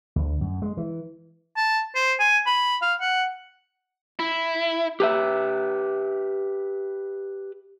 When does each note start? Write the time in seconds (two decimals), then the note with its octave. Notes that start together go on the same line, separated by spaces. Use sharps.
0.16 D2
0.41 F#2
0.62 G#3
0.77 E3
1.57 A5
1.95 C5
2.20 G#5
2.46 B5
2.82 F5
3.01 F#5
4.19 E4
5.00 G4 B4 E5